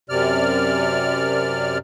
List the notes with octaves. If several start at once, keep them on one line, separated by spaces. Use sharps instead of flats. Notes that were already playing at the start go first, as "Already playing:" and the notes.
F#2 C3 D5 F6